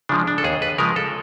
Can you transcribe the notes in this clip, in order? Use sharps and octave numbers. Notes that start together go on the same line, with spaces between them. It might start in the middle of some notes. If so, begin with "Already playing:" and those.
C#3 F3 G#3 D4
D4
A4
D#2 G#4
B4
C#3 F3 G#3 A#4
A4